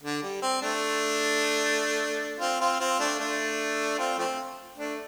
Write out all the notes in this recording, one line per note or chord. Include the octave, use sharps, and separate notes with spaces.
D3
G3
C4
A3 D4
C4 F4
C4 F4
C4 F4
A3 D4
A3 D4
C4 F4
F3 A3 C4
A3 D4